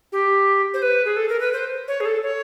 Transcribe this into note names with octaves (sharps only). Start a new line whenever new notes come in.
G4
C5
B4
G#4
A4
A#4
B4
C5
C#5
G#4
A4
C#5